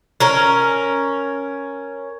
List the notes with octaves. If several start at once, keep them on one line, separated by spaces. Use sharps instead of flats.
C#4 A#4